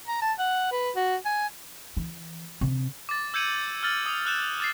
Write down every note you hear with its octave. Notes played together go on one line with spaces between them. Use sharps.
A#5
A5
F#5
B4
F#4
G#5
E3
C3
D6 A6
E6 G6 G#6 C#7 D#7 F#7
E6 F6 A6 F#7
D#6
E6 F#6 G6 E7
D6 A6 C7